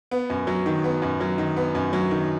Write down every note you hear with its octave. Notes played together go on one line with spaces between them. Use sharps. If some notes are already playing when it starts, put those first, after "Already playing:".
B3
F#2
F#3
D#3
B3
F#2
F#3
D#3
B3
F#2
F#3
D#3